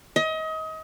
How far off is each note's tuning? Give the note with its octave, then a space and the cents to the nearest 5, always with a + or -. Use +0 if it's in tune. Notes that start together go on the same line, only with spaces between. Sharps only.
D#5 +30